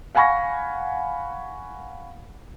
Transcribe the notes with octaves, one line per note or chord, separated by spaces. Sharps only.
F5 F#5 G#5 B5 C#6 A#6